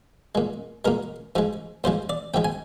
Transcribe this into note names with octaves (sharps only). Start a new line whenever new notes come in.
A#2 G#3
A#2 G#3 A#4
G#2 F3 G#3
G#2 F3 G#3 C5
D5
G#2 F3 G#3 G5
G#5